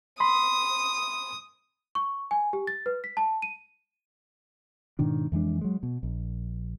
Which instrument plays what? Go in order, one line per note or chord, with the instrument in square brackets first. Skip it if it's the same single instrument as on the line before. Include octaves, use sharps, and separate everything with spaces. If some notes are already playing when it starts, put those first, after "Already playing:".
[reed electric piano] B5 C6 [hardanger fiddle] D#6
[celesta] C#6
G#5
G4
A6
B4
B6
A5
D#7
[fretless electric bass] G#2 B2 D#3 D4
F2 E3 G#3 D4
F#3 G#3
B2
A#1